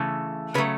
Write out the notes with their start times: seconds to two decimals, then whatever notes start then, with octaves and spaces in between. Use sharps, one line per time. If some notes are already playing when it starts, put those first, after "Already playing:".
Already playing: C#3 E3 A3
0.54 C#3 F#3 A3 B4